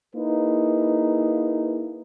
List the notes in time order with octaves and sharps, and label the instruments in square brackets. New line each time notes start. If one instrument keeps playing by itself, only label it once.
[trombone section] A#3 D#4 E4 G#4 B4